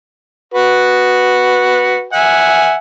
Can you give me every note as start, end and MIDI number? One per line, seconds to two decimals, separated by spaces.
0.54 2.06 66
0.54 2.06 71
2.13 2.76 76
2.13 2.76 78
2.13 2.76 80